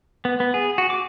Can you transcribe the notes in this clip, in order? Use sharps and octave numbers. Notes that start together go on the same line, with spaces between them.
B3
B3
G#4
F#4
D6